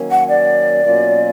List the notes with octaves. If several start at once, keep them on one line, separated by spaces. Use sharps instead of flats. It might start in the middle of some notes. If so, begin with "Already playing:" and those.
Already playing: D#3 F#3 A#3 C#4
F#5
D5
B2 F#3 A#3 C#4 F4